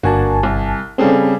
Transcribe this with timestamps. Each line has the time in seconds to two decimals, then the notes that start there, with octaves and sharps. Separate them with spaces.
0.03 G1 A#3 D4 F#4 G#5 A5
0.43 C2
0.98 C#3 G3 C4 C#4 G#4 A4